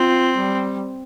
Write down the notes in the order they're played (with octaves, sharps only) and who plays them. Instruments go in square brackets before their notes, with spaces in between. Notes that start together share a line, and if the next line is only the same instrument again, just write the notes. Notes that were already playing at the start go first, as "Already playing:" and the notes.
Already playing: [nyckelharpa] C4 [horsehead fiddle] F4
[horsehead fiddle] G3